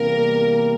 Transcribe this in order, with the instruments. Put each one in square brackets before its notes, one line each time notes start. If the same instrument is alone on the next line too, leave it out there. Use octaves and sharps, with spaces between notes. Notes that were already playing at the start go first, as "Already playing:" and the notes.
Already playing: [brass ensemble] E2 C3 G3 A#3 [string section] A#4